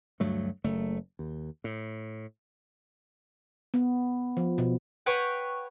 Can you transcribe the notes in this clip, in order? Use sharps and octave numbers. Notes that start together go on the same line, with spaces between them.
D2 G2 F#3 A3
F#1 A3
D#2
A2
B3
F3
B2
B4 C#5 F#5 G5